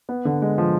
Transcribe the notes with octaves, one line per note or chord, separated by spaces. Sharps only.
B3
D3
G#3
F3